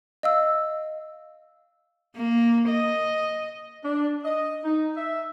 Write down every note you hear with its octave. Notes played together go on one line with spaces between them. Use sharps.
D#5 F5 E6
A#3
D#5
D4
D#5
D#4
E5